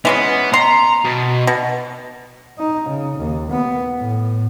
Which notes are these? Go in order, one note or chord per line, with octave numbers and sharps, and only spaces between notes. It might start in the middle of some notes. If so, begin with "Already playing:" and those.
E3 G#3 B3 C#4
A#5 C6
B2
B2
D#4
C#3
D#2
B3
A2